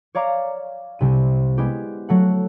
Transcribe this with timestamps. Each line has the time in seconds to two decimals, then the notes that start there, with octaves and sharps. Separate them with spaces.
0.15 C#5 D5 F5 A#5 D6
0.99 C2 C3 D#7
1.58 G#3 B3 E4 G4
2.09 F#3 A3 F#5